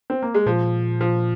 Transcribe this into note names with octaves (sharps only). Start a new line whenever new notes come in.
C4
A#3
G#3
A#2 F3
F3